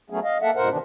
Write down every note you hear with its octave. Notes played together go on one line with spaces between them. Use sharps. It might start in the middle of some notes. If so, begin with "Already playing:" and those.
F#3 A3 B3 C#4 G#4
D#5 F5
A#3 A4 E5 F#5
F2 G#2 B2 A#4 C5 F#5
C3 D#3 E3 B3 D4